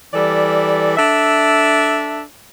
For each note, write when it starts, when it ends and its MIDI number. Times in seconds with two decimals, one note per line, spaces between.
0.13 0.96 52
0.13 0.96 55
0.13 0.96 69
0.13 0.96 74
0.97 2.21 62
0.97 2.21 69
0.97 2.21 76